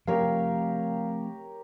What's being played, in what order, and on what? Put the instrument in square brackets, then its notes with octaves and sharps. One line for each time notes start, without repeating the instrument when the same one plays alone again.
[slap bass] F3 A3 C4 [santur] G4 A#4 C#5 [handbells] F5